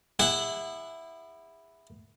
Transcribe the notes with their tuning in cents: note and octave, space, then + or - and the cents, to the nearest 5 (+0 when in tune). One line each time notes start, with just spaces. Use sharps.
E4 +0 G#4 -40 F#5 +0